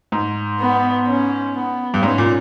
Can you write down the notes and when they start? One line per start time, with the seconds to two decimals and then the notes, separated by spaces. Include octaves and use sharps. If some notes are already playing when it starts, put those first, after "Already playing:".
0.12 G#2
0.60 B3
1.08 C#4
1.54 B3
1.94 G2
2.02 G#2 C#4
2.18 A#2